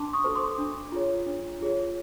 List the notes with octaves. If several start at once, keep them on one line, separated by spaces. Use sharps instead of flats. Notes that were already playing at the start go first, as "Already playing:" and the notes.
Already playing: D4 A5 C6 D6
C#6 D#6
F#4 A4 C5
C6 D6
D4
F4 G#4 C#5
D4
F4 G#4 C#5